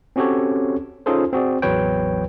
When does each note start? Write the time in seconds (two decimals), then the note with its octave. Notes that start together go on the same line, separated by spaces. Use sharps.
0.16 C4 C#4 F#4 G4 A4 C#5
1.06 C#4 D#4 F4 G#4 A4 C5
1.33 C4 F#4 G#4 D5
1.62 A1 E2 F#3 B4 C#5 G5